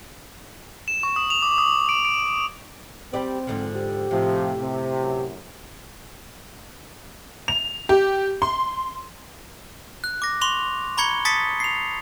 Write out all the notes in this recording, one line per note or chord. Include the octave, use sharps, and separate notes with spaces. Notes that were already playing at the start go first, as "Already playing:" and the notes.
E7
C#6
D#6
F7
D6
D#6
D7
D7
G3 C4 G4 D5
G#2 D3 F3
G4
A2 C3 F3
C3
F#2
F7
G4
C6
F#6
D6 A#6
C6 C#6 F7
A#5 B5 C#6 G#6 C#7 G7
A5 D#6 A6 B6 C#7
C7 F7